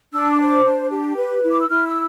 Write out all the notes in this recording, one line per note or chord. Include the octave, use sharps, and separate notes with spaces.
D4 E6
D6
C5
D6
D4
G4
B4
E4
D6
E6
E4 F6
E6